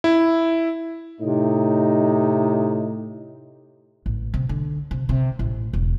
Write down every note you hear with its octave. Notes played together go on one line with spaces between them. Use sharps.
E4
A2 C3 D#4
A1
C3
D3
C3
C3
A1
E1